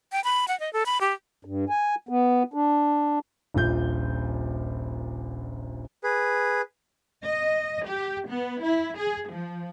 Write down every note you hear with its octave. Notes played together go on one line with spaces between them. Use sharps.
G5
B5
F#5
D#5
A4
B5
G4
G2
G#5
B3
D4
D#1 A#1 F4 G6
G#4 B4
D#5
G4
B3
E4
G#4
F3